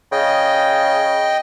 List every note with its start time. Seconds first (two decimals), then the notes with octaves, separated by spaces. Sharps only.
0.12 C#3 D#5 G5